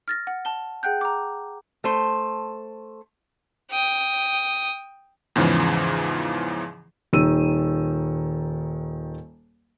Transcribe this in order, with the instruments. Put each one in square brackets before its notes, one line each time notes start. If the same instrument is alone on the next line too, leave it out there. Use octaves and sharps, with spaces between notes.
[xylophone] F6 A6 A#6
F#5
A5 G7
G#4 F#5 G5 F#6 G6
A#5 D6
[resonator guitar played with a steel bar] A3 C5
[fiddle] G5 D#6
[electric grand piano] E2 G#2 C#3 E3 F3
[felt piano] D#1 D#3 E6 D#7